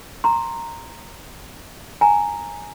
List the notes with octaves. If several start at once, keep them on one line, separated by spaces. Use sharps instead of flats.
A#5 C6
G#5 A#5